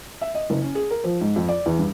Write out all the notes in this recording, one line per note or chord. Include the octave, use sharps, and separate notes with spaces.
E5
D#5
F#1
C#4
G#4
A#4
F3
G#2
F2
D5
E2
G2